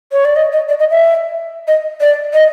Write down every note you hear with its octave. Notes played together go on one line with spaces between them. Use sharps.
C#5
D5
D#5
D#5
D5
D#5
E5
D#5
D5
D#5